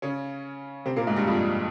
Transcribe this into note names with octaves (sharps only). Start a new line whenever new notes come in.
C#3 C#4
C3 C4
A#2 A#3
G#2 G#3
G2 G3
F2 F3